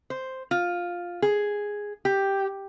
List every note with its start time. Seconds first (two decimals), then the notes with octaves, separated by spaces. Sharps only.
0.10 C5
0.51 F4
1.22 G#4
2.05 G4